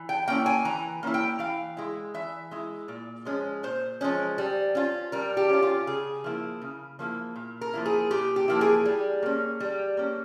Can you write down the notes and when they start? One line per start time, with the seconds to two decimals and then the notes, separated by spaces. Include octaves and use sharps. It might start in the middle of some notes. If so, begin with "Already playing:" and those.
Already playing: E3
0.09 G5
0.28 A#3 C#4 E4 G5
0.46 G#5
0.65 E3 A#5
1.03 A#3 C#4 E4
1.14 G5
1.39 E3 F5
1.77 G#3 E4
2.14 E3 E5
2.51 G#3 E4
2.88 A#2
3.25 F3 G#3 C#4
3.63 A#2 C5
4.01 F3 G#3 C#4
4.38 G3
4.75 C#4 F4
5.12 G3 A#4
5.37 G4
5.49 C#4 F4
5.62 F4
5.87 C#3 G#4
6.24 F3 A#3 E4
6.62 C#3
6.99 F3 A#3 E4
7.36 A#2
7.61 A#4
7.74 F3 A#3 E4
7.86 G#4
8.11 A#2 G4
8.36 G4
8.48 F3 A#3 E4
8.61 G#4
8.86 G3
9.23 A#3 C#4
9.60 G3
9.97 A#3 C#4